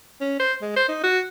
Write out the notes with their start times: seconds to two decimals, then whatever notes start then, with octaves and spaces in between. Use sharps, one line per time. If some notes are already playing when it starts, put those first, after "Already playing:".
0.21 C#4
0.40 C5
0.62 G#3
0.76 C5
0.89 D#4
1.03 F#4